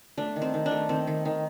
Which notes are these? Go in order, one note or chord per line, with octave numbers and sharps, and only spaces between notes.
A3 D4
D#3
C4
D#3
D4
A3
D#3 C4
D#3
D#3